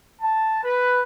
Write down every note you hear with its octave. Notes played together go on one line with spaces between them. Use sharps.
A5
B4